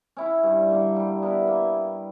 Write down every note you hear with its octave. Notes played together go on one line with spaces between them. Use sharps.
C#4 E4
G2
D3 A#3
G3
B3 E4 A#4
A#3